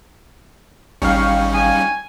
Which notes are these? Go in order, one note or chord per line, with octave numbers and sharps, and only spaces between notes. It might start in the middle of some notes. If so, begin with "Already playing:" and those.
G#1 G3 C#4 D#4 F5 G5 C#6
G#5